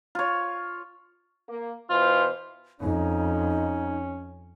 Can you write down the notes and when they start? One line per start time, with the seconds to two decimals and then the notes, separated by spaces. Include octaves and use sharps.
0.15 F4 C#5
1.48 A#3
1.90 B2 E3 F4 C5
2.81 F2 C#4 D#4